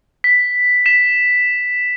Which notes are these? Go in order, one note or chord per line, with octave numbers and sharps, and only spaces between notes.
B6
B6 E7